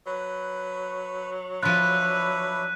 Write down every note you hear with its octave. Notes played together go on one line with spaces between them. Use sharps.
F#3 B4
F3 D4 E4 F4 B4 F#6 B6 D#7